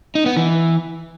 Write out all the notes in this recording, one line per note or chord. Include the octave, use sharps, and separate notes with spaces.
D#4
B3
E3